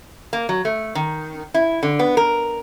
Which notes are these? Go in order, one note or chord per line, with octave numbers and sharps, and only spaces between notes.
A#3
F#3
A3
D#3
E4
D3
B3
A#4